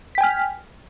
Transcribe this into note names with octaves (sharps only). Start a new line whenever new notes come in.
G5 G#5 F6 B6